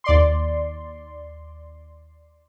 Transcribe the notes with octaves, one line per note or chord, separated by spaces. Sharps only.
D#2 D5 C6